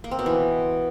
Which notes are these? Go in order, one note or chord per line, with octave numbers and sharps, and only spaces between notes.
A#3
C4
B2
E3